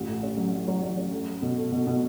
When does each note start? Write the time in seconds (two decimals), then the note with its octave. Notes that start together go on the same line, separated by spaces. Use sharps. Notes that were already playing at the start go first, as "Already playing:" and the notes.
Already playing: A1 F4
0.08 A2
0.23 C#4
0.37 F#3
0.53 F#3
0.68 F#3
0.83 F#3
0.97 C#4
1.12 A3
1.27 A3
1.42 B2
1.57 A3
1.72 B2
1.87 B2